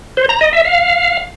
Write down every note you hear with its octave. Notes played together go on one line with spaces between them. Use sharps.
C5
A#5
D#5
E5
F5